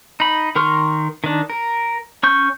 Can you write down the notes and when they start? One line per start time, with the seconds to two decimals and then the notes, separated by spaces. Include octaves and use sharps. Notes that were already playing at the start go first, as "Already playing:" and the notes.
0.20 D#4 B5
0.56 D#3 A#4 C6 C#6 F6
1.24 D#3 D4
1.50 A#4
2.23 C#4 C#6 G6